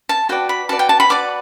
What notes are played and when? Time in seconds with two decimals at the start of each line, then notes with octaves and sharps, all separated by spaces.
0.09 A5
0.29 F#4 B4 D5 G5
0.49 B5
0.69 F#4 B4 D5 A5
0.79 G5
0.89 A5
1.00 B5
1.09 F#4 B4 D5 D6